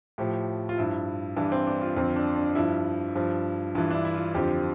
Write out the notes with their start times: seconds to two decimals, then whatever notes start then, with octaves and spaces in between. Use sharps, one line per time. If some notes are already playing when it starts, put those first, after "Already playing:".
0.18 A2 F3 G4
0.69 F4
0.78 G2 F3 E4
1.36 G2 E3 D4
1.52 C4
1.67 D4
1.81 F4
1.97 F2 D3 F3 C4
2.16 D4
2.36 D4
2.55 G2 F3 E4
3.15 G2 F3
3.75 G2 E3 F4
3.90 D4
3.95 E4
4.05 E4
4.14 F4
4.35 F2 D3 F3 G4